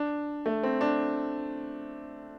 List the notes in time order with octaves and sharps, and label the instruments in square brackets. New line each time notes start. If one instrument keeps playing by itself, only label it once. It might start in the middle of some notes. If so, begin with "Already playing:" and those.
Already playing: [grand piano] D4
A3
C4
D4